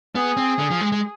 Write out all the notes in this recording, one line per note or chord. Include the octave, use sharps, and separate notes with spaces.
B3 G#4
C4
D3
F3
G#3
G#3